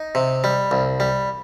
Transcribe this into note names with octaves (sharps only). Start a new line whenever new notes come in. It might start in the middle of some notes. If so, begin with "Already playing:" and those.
Already playing: D#4
C3
G3
C2
G3